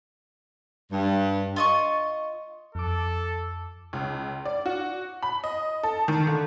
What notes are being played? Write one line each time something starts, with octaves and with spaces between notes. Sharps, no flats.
G2
F4 D#5 C#6
F2 A4 D6
C#2
D5
F#4
B5
D#5
A4
D#3
D3